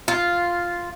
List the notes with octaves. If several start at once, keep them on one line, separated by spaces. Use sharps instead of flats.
F4